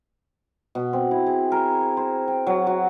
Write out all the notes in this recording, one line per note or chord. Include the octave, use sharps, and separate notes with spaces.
B2
C4
E4
G#4
A#4
C5
G5
F#3
F#4